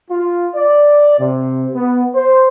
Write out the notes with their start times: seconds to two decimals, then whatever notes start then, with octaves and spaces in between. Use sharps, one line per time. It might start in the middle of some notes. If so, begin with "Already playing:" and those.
0.10 F4
0.55 D5
1.19 C3
1.74 B3
2.15 C5